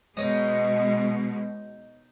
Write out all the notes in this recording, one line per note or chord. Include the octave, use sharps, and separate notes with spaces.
B2 G#3 D#4 C#5 D#5